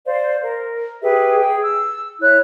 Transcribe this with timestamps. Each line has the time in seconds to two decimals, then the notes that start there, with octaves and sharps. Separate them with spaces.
0.06 C5 D5 F5
0.42 A#4
1.03 G4 G#4 B4 E5
1.40 G#4 G5
1.62 E6
2.20 E4 C#5 F#6